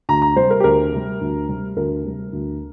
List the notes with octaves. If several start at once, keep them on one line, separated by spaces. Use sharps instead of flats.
D2 A#5
A#5
C3 G3 C5
A#4
G4
D2 A#4
C3 G3
D2
C3 G3
D2 A#4
C3 G3
D2